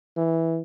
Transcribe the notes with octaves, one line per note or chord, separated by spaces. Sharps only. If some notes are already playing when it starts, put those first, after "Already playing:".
E3